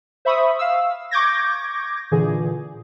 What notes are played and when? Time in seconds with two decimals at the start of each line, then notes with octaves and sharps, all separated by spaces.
0.25 C5 E5 B5 C#6 D#6
0.59 F5 E6
1.11 C#6 D6 G6 G#6 A#6
2.11 A#2 D3 E3 G#4